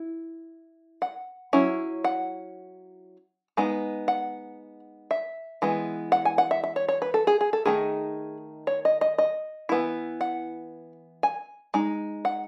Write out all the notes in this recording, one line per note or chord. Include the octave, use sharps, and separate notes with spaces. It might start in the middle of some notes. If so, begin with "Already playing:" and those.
Already playing: E4
F#5
F#3 C#4 E4
F#5
G#3 B3 D#4
F#5
E5
E3 G#3 B3
F#5
G#5
F#5
E5
E5
C#5
C#5
B4
A4
G#4
G#4
A4
D#3 A3 D#4 G#4
C#5
D#5
D#5
D#5
E3 B3 E4
F#5
G#5
G#3 D#4
F#5